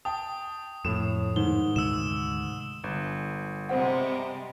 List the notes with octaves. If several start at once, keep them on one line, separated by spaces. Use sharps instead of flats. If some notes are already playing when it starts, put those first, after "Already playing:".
G5 A5 D#6
F2 A2 E7
G#2 D#3 G7
D2 C3 G#3 E6 E7
G1
C3 G3 G#3 C5 F#5